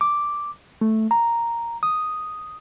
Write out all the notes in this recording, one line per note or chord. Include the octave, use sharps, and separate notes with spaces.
D6
A3
A#5
D#6